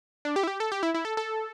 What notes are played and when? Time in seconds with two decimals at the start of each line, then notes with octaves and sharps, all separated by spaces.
0.25 D4
0.36 G4
0.43 E4
0.47 G4
0.60 A4
0.72 G4
0.83 E4
0.94 E4
1.05 A4
1.17 A4